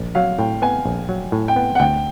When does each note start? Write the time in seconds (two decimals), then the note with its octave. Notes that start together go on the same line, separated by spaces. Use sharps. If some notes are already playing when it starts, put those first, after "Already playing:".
Already playing: A#1
0.15 F#3 F5
0.39 A2 G5
0.62 B3 G#5
0.85 A#1
1.09 F#3
1.32 A2
1.48 G5
1.56 B3
1.75 F#5
1.79 D2 G5